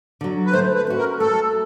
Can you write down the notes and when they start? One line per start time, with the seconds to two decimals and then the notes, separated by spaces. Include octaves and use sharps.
0.21 D3 F#3
0.46 B4
0.53 A3 C5
0.75 B4
0.87 C#4 F#4
0.98 A#4
1.20 A3 A4